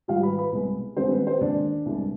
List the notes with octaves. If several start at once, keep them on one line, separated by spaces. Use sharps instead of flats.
G#2 D#3 G3 F4 F5
B4 B5
B4 B5
C2 B2 G#3
G2 D#3 G#3 C4 C5
B3 B4
C4 C5
D#2 D#3 G#3 D4 D5
C2 B2 G#3